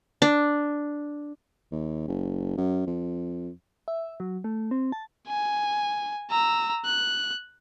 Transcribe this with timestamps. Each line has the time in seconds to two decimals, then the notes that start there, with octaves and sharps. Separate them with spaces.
0.22 D4
1.72 D#2
2.08 F#1
2.57 F#2
2.87 F2
3.88 E5
4.20 F#3
4.44 A3
4.71 C4
4.92 A5
5.28 G#5
6.31 A#5 E6
6.85 F#6